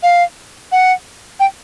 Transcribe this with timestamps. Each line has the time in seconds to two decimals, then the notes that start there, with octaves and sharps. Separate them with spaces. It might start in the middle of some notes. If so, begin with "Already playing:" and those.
0.03 F5
0.72 F#5
1.40 G5